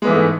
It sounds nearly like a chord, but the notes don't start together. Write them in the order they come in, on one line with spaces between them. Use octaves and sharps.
G#3 B3 E3 A3 G#2